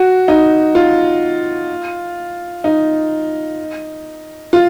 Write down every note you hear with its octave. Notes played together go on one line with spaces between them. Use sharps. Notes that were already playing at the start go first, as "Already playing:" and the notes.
Already playing: F#4
D#4
F4
D#4
F4